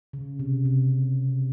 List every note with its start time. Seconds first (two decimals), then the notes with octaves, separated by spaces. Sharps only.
0.13 C#3
0.39 C3
0.65 C3